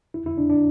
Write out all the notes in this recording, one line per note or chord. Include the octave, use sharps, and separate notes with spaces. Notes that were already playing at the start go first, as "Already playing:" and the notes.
E4
E4
D4
D4